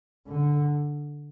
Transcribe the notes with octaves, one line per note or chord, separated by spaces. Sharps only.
D3